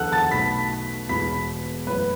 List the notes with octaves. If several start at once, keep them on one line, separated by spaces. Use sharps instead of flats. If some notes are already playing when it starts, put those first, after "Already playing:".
Already playing: E2 D3 F#3 B3 A4 F#5 A5 F#6
A5 A6
B1 B2 A3 B5 B6
E1 E2 B2 B5 B6
F#2 E3 A3 B4 B5